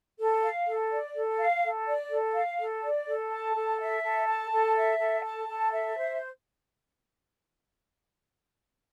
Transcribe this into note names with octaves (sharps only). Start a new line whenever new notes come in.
A4
F5
A4
D5
A4
F5
A4
D5
A4
F5
A4
D5
A4
A5
A4
E5
A4
A5
A4
E5
A4
A5
A4
E5
C5